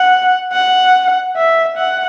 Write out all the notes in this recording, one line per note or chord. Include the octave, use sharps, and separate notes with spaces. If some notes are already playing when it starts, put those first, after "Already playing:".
Already playing: F#5
F#5
E5
F#5